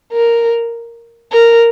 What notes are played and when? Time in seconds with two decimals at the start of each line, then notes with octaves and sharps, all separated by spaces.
0.13 A#4
1.32 A#4